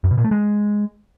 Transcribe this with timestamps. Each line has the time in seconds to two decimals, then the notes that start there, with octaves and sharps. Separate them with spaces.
0.04 F#2
0.11 B2
0.18 A#2
0.24 A3
0.31 G#3